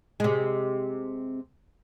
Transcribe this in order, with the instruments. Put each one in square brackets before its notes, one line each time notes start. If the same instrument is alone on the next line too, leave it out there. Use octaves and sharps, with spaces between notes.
[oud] C3 G#3